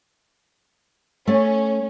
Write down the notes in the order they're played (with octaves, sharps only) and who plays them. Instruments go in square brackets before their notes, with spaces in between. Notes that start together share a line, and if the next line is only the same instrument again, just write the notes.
[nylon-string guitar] A3 [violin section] C#4